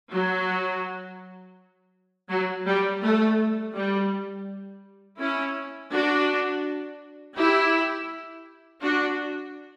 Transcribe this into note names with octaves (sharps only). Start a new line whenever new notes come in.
F#3
F#3
G3
A3
G3
C#4 E4
D4 F#4
E4 G4
D4 F#4